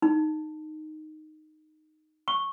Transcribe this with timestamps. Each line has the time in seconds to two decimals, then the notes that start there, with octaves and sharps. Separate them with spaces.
0.02 D#4
2.28 C#6